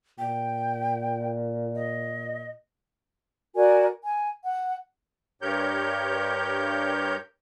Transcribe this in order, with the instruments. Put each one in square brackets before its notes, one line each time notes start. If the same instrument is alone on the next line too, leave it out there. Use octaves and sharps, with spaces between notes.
[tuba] A#2 [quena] G5
[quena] D#5
[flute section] F#4 A#4 D5 G#5
G#5
F#5
[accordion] G2 G4 A#4 C#5 G6